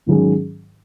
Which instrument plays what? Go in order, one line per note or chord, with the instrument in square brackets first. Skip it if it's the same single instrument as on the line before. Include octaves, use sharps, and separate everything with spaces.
[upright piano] G#2 D#3 F#3 C#4 G#4